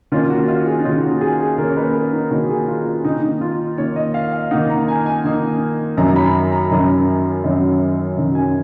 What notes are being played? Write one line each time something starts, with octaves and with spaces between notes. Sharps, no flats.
D#3 A#3 C#4 F4
F#4
F4
G#4
D#4
D#3 A#3 C#4 F4
F#4
G#4
G#4
D#3 A#3 C#4 A#4
C#5
B4
A#4
D#4
D#3 A#3 C#4 F#4
G#4
F4
F4
D#3 A#3 D#4
D#4
F4
D#3 A#3 D#4 C#5
D#5
F5
F5
D#3 A#3 D#4 F#5
A#5
G#5
G#5
D#3 A#3 D#4
F#2 D#3 F#3 C#4 A#5
B5
A#5
A#5
F#2 D#3 F#3 C#4
F#2 D#3 F#3 C#4
F#2 D#3 F#3 C#4
G#5